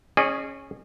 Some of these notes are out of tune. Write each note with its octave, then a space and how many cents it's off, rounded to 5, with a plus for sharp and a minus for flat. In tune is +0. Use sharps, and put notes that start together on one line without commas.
C#4 -10 G#4 +0 D#5 -45